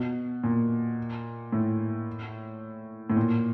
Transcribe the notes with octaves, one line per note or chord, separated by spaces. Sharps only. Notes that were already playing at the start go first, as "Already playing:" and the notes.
Already playing: B2
A#2
A2
A2
A#2